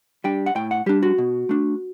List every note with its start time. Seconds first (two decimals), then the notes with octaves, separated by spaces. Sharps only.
0.24 G3 D4 G5
0.46 F#5
0.55 A2 G5
0.71 F#5
0.86 G3 D4 G4
1.03 F#4
1.18 B2
1.49 A3 D4